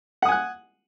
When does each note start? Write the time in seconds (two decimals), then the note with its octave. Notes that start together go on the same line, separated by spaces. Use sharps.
0.22 F#5
0.25 D#6
0.29 G#5
0.32 F#6